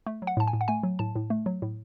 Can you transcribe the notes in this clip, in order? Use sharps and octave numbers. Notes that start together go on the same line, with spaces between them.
A3
F#3
F#5
A2 A5
G#5
A2
F#5
A3 G#5
F#3
A2 A5
A2
A3
F#3
A2